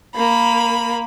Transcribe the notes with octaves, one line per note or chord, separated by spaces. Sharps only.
A#3 B5